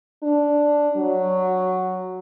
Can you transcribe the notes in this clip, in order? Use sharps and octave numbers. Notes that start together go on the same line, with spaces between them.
D4
F#3